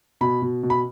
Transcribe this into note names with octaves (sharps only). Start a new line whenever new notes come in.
B2 B5
B2
B2
B5